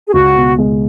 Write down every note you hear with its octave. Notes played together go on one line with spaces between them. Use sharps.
G#4
C#2 F#4
B2
G#3